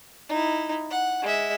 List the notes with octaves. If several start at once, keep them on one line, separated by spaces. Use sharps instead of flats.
D#4 E4
F#5
G#3 E5